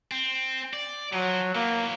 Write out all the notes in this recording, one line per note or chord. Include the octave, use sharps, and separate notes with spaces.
C4
D5
F3 F#3
E3 F#3 A#3